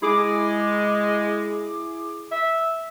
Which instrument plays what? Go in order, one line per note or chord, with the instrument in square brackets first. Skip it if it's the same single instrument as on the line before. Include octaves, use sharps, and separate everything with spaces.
[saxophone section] G#3 [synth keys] E4 G#4 D6
[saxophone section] E5